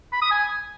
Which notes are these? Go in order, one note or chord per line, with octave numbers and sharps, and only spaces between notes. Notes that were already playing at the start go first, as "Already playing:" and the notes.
B5
D#6
G#5